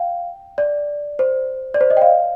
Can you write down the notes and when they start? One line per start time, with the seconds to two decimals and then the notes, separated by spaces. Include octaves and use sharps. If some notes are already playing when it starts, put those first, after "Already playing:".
Already playing: F5 G5
0.58 D5
1.19 C5
1.74 D5
1.81 C5
1.90 D#5
1.97 G5
2.02 F5